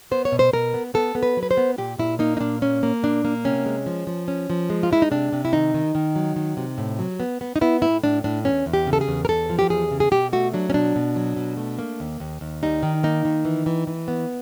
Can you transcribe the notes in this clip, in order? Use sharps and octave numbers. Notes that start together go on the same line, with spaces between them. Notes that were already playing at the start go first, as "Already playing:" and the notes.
B3 C5
C#5
B2
C5
B2 A#4
B3
B3 A4
B3
B4
F#3
B4
C5
B3
A#2 G4
A#2 E4
A#3 D#4
D#4
A#2 D4
A#3 C#4
A#3
A#2 D4
A#3
C3 C#4
G#3
F3
F3
C#4
F3
G#3
F4
G#3 E4
D#4
C3 D4
C3
E4
D#3 D#4
D#3
D#3
F#3
D#3
C3
A2
F#3
B3
B3
D#4
B3 E4
A2 E4
A2 D4
A2 D4
E2 C#4
E2
G4
C#3
A4
G#4
E2
A#4
E2 A4
F3
G4
E2 G#4
C#3
G#4
B2 G4
A3 F#4
F#3 D4
C#4
B2 D4
B2
F#3
B2
A3
A#3
D#2
D#2
D#2
G3 D#4
D#3
A#3 D#4
D#3
E3
E3
E3
B3